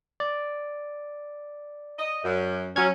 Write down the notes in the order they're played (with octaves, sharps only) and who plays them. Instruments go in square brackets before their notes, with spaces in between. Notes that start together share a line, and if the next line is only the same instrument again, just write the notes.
[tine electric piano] D5
[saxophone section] D#5
F#2
[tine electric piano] F#3 F6 G#6 [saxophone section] C#4